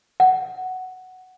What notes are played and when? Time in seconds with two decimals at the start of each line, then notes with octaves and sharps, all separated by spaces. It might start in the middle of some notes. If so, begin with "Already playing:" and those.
0.20 F#5